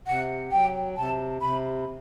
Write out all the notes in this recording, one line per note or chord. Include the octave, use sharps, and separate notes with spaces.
C3 F#5
F#3 G5
C3 A5
C3 B5